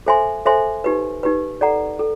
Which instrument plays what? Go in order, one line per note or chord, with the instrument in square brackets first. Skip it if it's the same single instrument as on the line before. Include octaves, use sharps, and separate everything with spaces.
[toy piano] A4 C5 E5 G#5 C6
A4 C5 E5 G#5 C6
D#4 G4 B4
D#4 G4 B4
A4 D5 F#5 A#5
A4